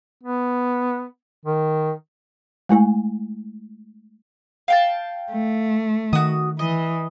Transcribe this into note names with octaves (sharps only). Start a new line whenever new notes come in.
B3
D#3
G#3 A3 E4 G#5
F5 G5 A5
A3
D#3 F#4 D#6
E3 D#5